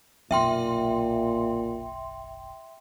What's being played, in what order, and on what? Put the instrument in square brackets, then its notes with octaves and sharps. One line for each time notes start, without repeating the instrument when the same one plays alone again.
[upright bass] F#1 B1 [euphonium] A#2 [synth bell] E5 G5 C6